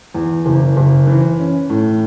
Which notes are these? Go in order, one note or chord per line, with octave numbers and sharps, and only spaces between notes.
E2
F#1
F#1
E3
C#4
A2